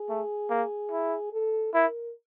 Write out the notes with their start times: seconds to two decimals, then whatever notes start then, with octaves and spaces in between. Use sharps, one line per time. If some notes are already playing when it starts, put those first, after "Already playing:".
Already playing: G#4
0.09 A3
0.50 A#3
0.91 E4
1.33 A4
1.74 E4 A#4